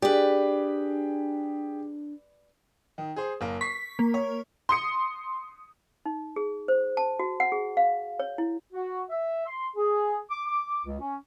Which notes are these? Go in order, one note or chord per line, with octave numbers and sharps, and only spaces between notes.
D4 G4 G#4 B4 D5
D#3
G#4 C5
F#1 A#3
C#6 B6 C7
A#3
C#5
C6 D#6 C#7
D#4
G#4
C5
A5
F#4
F#5
G#4
F5
C#5
E4
F#4
E5
C6
G#4
D6
D6
C#2
C#4